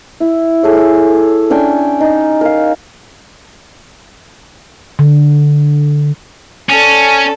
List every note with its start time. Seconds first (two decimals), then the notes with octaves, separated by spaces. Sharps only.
0.20 E4
0.63 G#4 A4 C#5
1.50 C#4 D4 G5 G#5
2.00 D#4
2.41 A#4 F5
4.99 D3
6.70 C#4 A4 D5